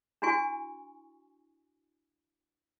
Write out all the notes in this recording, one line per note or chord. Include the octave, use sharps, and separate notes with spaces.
D4 E4 F#4 G#5 C#6